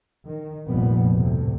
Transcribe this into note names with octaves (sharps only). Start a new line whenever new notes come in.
D#3
F1 A#1 A#2 F3 G3 B3
D2 A2 C3